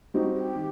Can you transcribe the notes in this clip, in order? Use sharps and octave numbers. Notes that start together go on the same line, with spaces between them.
G3 C4 D#4 F#4 G4
G4
D#3